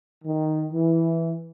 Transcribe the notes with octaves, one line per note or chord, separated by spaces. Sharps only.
D#3
E3